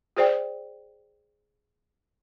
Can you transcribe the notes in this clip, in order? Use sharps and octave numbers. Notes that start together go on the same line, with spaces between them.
F#4 G#4 C5 D5 G5